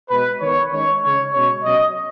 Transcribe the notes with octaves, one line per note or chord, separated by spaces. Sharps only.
B2 G#3 B3 B4
D#3 B3 C#5
D#3 G#3 C#4 C#5
C#3 G#3 C#4 C#5
B2 G#3 C#4 C#5
B2 F#3 C#4 D#5